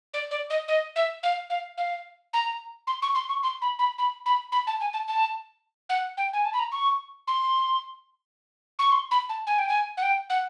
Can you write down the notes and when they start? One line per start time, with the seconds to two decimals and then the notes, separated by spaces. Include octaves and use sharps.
0.14 D5
0.31 D5
0.50 D#5
0.68 D#5
0.96 E5
1.23 F5
1.50 F5
1.77 F5
2.33 A#5
2.87 C6
3.02 C#6
3.15 C6
3.29 C#6
3.43 C6
3.62 B5
3.79 B5
3.98 B5
4.26 B5
4.52 B5
4.67 A5
4.81 G#5
4.93 A5
5.08 A5
5.89 F#5
6.17 G5
6.33 G#5
6.45 A5
6.54 B5
6.59 A#5
6.72 C#6
7.27 C6
8.79 C#6
8.92 C6
9.11 B5
9.29 A5
9.47 G#5
9.58 G5
9.68 G#5
9.97 F#5
10.02 G5
10.30 F#5